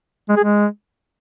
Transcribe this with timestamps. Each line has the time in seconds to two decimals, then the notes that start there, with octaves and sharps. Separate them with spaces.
0.29 G#3
0.36 G#4
0.44 G#3